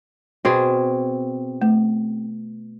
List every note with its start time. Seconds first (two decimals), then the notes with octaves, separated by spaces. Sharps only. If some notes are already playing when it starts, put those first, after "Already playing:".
0.45 B2 C4 G#4
1.62 A3